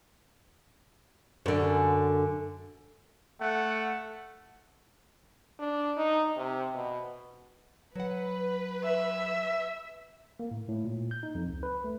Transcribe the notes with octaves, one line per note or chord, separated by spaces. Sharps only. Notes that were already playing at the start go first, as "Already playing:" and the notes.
F#2 D3
A3 F#5
D4
D#4
C3
B2
F#3 B4 F#5
E5
A#3
A2
A2
A#2
G6
D#4
F2
C#2
B4
A3